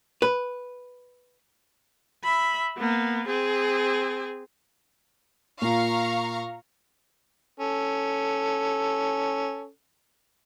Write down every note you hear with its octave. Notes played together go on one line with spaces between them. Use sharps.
B4
E5 B5
A#3 B3
C4 G#4
A#2 F5 A#5 C#6
C#4 A4